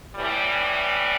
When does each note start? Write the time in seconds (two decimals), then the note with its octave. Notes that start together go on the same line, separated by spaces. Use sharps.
0.16 A2 E3 G3